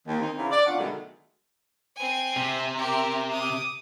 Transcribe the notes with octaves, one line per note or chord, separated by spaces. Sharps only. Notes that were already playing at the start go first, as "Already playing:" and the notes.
D#2
D#3 C4 D#4
C#3 E3 F#3 E4 F4
D5
E2 C#4 D4 F4 F#5
B2 D3 D#3 F#3 G#3 A3
C4 G#5
C3
G4 A#4
D6 D#6